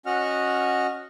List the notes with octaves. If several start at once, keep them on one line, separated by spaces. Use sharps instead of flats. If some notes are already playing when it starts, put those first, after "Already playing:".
C#4 F#4 D#5 F#5 F6